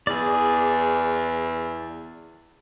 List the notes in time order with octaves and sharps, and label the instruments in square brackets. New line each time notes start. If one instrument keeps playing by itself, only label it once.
[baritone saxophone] E2 [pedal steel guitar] G#4 D5